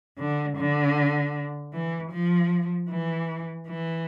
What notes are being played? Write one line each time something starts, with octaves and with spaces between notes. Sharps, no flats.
D3
D3
E3
F3
E3
E3